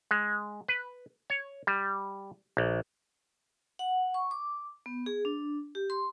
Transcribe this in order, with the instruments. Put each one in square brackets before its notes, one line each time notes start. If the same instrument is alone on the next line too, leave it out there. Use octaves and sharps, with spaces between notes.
[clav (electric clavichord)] G#3
B4
C#5
G3
A#1
[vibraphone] F#5
C#6
D6
B3
G#4
D4
G4
C6